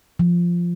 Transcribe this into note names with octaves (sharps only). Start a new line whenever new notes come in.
F3